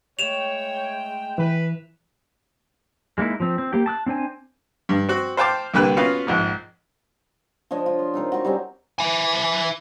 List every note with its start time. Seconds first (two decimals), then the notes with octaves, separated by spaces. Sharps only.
0.19 G#3 A3 C#5 G5 E7 F7
1.38 E3 B4
3.18 G#3 A#3 D#4 E4
3.40 F3 C4
3.58 C4
3.73 A#3 G4 G5
3.86 A5 D#6 F#6
4.06 C4 D4 C5 G#5
4.89 G2
5.09 C4 F#4
5.37 C5 F5 G5 A5 D6
5.74 C2 D3 A#3 G4 B4 F#6
5.97 B3 C#4 F4 F#4 F5
6.27 A#1 G#2 F3
7.71 F3 D4 C#5 D#5
7.86 F4
7.99 C6
8.14 C4 D#4 A#4
8.32 F#4 C#6
8.44 G3 C4 C#4
8.99 E4 G#5